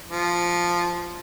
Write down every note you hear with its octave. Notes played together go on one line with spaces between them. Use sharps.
F3